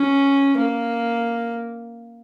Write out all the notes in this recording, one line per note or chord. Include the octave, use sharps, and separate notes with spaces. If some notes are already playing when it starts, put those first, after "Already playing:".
Already playing: C#4
A#3